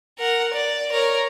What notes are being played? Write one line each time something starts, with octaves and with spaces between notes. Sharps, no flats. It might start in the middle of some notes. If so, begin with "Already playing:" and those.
A#4 F#5
D5
A#4 C#5